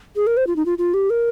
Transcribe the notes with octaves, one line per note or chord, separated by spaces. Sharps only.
G#4
A#4
C5
F4
D#4
F4
F4
G4
A#4